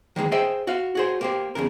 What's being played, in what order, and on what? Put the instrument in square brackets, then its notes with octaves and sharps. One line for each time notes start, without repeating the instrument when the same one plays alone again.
[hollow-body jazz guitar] D#3 E3 G#3 A#3
G#4 C5 D#5 E5 G5
F#4 F5
F#4 G#4 C5
A#3 G4 C5
E2 G#2 C#3 A#4